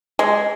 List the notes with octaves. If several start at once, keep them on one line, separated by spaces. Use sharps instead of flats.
G#3